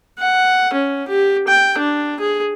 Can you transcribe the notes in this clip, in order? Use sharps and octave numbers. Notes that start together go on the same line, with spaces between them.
F#5
C#4
G4
G5
D4
G#4